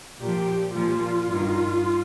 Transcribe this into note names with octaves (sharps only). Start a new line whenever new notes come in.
A#2 F3 G4
A#2 F3 F4
G2 D#3